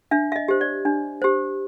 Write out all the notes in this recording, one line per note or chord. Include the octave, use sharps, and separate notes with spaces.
D4 E5
E5
D#5
G4 C5
D5
D4
G4 C5